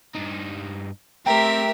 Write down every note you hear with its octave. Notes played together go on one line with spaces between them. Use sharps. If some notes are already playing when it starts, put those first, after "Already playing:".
G2 D#4
A3 C4 G4 A#4 E5 G5 A#5